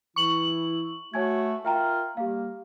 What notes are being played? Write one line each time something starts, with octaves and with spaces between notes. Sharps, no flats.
E3 E4 C#6 F#7
A3 F#4 C#5 G#5 G#6
F4 A#4 E5 G5 A#5
G3 A#3 G4 F5